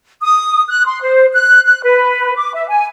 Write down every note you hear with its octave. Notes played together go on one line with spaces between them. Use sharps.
D#6
F#6
C6
C5
F#6
F#6
B4
D6
E5
G#5